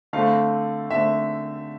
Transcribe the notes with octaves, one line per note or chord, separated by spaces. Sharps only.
D3 A3 C4 F5
D3 A3 C4 E5